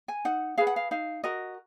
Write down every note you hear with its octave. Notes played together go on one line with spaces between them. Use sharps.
G#5
D#4 F#5
G#4 B4 F5
F#5
F5
D#4 F5
F#4 A#4 D#5